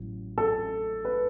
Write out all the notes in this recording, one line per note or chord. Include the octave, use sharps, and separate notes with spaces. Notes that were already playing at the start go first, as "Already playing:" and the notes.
Already playing: A1 F#3
A4
B4